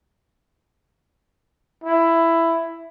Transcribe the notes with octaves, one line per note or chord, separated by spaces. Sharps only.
E4